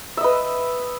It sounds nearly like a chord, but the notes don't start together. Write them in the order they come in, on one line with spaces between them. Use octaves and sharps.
E5 D#5 B4